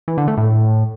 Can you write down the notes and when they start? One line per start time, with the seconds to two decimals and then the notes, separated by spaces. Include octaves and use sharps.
0.08 E3
0.18 D3
0.28 A3
0.38 A2